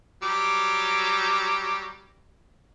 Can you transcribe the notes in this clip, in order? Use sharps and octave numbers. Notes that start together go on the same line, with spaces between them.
F#3 G3 D6